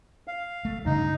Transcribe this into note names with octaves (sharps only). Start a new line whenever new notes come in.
F5
A3
G2 C#3 D#4